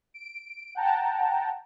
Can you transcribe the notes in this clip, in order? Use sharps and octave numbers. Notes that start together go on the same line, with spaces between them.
D7
F#5 G5 A5 A#5